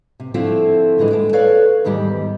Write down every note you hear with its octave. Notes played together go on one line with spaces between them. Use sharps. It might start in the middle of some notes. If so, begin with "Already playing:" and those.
C3
D3 F3 A3 C4 E4 F4
A2 D3 E3 G#3
G#3 A3
A4 B4 C#5 D5 F5
E2 G#2 D#3 G3 G4